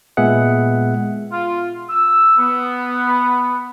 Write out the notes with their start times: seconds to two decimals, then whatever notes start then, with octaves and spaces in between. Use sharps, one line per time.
0.17 A#2 G#3 B3 G#4 E5 F#5
1.32 F4
1.88 E6
2.38 B3